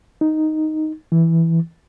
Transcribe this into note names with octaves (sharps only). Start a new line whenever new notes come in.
D#4
E3